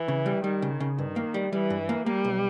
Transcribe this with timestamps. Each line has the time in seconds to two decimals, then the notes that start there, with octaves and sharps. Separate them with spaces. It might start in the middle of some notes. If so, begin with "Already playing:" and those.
Already playing: E3
0.08 C#3
0.26 G3
0.44 D#3 G3
0.62 C#3
0.80 C#3
0.98 G2 D#3
1.16 A#3
1.34 G3
1.52 E3 G3
1.70 G2
1.89 A#3
2.06 G3 A#3
2.24 B1